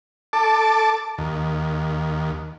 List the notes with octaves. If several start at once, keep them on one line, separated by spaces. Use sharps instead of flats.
A4 A5 D6
D#2